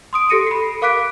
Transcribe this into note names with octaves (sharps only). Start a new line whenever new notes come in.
C6 D#6 D7
G4 A4 A#6 C#7 D#7
B5 C7
A#4 F5 D6 F#6 B6 D7